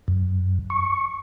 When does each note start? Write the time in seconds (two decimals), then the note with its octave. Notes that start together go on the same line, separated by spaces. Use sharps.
0.08 F#2
0.70 C#6